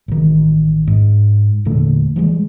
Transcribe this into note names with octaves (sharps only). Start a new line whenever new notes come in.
A1 D#3
G#2
E1 A#2 D3 A3
E3 G3 G#3